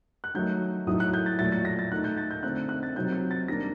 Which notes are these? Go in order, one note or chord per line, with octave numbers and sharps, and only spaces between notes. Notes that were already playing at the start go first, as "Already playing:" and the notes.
F#6
D#3 F#3 A3 D#4 G6
A2 F#3 A3 D#4 D#6
F#6
G6
A6
A#2 F#3 A3 A6
A6
A#6
A6
D#3 A3 D#4 F#6
G6
A6
G6
D3 A3 C4 D#4 F#6
F#6
A6
C3 F#3 C4 D#4 G6
G6
A6
D#3 G3 A#3 D4 A#6